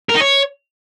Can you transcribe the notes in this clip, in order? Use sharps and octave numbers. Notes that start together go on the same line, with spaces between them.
A#4
D#4
C#5